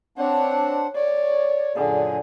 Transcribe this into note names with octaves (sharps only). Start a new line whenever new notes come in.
C4 D4 C#5 F#5
C#5 D5
F#2 A#2 D3 G#4